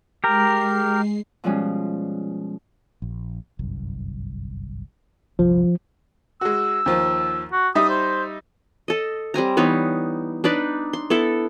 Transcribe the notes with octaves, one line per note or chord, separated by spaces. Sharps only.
G#3 G4 A#4 C7
B2 F3 G3 G#3 C#4
A#1
G1 C2 F#2
G1 C2 F3
G#3 F#4 E6
D#2 F3
F#4
G3 D#4 E5 D#6
C5
A4 D#5
G3 C4 G#5 A#5
E3 B3 D#4 C#5
D4 D#4 B4 D5
C6
B3 E4 A4